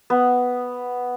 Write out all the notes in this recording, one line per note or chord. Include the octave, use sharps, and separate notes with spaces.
B3